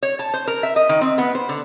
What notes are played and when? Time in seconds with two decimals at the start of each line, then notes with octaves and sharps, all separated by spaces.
0.03 C#5
0.19 A5
0.34 C5
0.47 A#4
0.63 E5
0.76 D#5
0.89 D#3
1.01 C4
1.18 B3
1.35 C5
1.49 D3